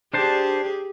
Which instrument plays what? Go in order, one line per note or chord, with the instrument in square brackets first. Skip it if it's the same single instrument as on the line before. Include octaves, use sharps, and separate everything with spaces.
[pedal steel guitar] D4 C5 A5 [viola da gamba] G4 G#4